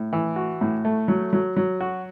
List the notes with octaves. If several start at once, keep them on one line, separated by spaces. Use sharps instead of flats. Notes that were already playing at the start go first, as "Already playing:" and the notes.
Already playing: A2
E3
F#4
A2
A3
F#3
F#3
F#3
F#4